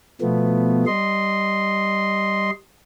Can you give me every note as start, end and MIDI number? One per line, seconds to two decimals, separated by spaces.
0.21 0.85 47
0.21 0.85 53
0.21 0.85 57
0.21 0.85 59
0.87 2.51 55
0.87 2.51 75
0.87 2.51 84